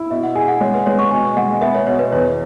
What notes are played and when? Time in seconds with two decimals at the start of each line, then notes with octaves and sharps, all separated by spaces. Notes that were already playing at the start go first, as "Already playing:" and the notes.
Already playing: E4
0.11 B2 E5
0.23 F#5
0.35 G#4 G#5
0.48 F#5
0.61 G#3 C#5
0.74 B4
0.86 G#3 C#5
0.99 C#6
1.11 B2 G#5
1.37 G#3 F#5
1.61 B3 E5
1.75 C#5
1.86 B2 C#5
1.99 B4
2.12 E2 C#5